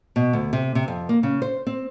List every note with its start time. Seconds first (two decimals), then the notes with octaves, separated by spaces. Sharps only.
0.16 B2
0.33 D2
0.53 C3
0.75 C3
0.88 F2
1.09 A#3
1.23 C#3
1.42 C5
1.67 C4